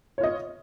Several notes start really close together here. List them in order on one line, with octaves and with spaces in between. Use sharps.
C#5 F4 D#5